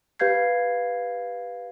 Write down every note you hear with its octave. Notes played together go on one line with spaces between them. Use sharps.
G4 B4 F5 G6 G#6 C7